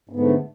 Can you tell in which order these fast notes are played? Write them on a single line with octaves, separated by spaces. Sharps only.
G#2 B3 D3 A3